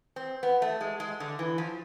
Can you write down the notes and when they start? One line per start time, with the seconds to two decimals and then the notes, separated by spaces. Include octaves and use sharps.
0.16 C4
0.43 B3
0.62 A3
0.81 G#3
1.00 G#3
1.20 D3
1.39 E3
1.58 F3